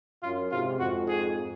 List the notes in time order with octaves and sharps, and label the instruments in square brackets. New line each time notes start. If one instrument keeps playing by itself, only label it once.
[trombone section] F#2 [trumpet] F4
[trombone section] G#2 C3 [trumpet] F4
[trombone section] F2 G#2 [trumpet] F#4
[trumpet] G#4